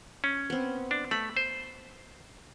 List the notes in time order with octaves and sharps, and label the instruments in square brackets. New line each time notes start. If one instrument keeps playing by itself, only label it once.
[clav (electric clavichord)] C#4
[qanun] B3 C4
[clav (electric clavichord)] D4
[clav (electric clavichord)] A3 [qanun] B5
[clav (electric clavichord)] C5